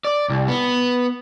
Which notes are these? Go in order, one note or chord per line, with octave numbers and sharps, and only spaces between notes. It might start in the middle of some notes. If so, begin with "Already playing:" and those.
D5
C2
B3